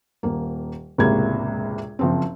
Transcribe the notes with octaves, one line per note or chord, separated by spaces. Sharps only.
D#1 A#3
E1 C#2 A2 C3 A#3 G#6
F#1 F3 C4